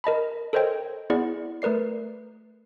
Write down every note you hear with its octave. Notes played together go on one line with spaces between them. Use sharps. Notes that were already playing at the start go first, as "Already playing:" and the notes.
A#4 D#5 A5 B5
A4 A#4 C5 C#5 D#5 G5
B3 E4 G#4 D5 F#5
A3 A#4 B4 D5 C7